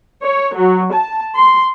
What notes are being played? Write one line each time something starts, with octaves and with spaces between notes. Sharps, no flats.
C#5
F#3
A5
C6